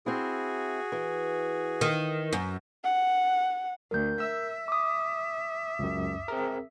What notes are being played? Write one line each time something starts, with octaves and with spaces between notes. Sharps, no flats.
C4 E4 F#4 G#4
E3
D#3
F#2
F#5
D2 A#4 G6
E5 E6
D6 D#6
C#2 F#2
C4 G#4 A#4